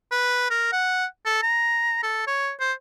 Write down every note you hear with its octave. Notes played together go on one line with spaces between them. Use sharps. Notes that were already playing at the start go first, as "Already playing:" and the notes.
B4
A#4
F#5
A4
A#5
A4
C#5
C5